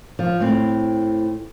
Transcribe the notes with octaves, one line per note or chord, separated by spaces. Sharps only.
F3
A2 C4